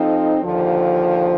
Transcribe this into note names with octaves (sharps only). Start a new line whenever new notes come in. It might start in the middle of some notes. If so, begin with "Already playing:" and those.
Already playing: F3 C4 D#4 A4
D#2 D3 F3